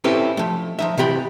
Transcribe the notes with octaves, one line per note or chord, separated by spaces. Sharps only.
C4 C#4 E4 G4 A4 B4
F3 A3
F3 D#4 E5
C3 E3 G4 B5